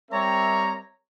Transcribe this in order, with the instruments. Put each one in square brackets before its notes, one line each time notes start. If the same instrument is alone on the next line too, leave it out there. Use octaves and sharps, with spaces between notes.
[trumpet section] G3 C4 A#4 C#5 E5 A#5